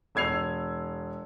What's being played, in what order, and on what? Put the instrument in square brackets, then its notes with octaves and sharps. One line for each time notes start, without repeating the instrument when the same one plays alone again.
[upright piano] E1 E6 G#6 C7 F7